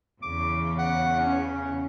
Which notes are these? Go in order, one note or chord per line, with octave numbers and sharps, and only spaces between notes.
E2 C#3 D6
F#5
C#4